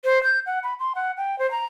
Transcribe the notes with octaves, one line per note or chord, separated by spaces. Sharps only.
C5
G6
F#5
B5
C6
F#5
G5
C5
A#5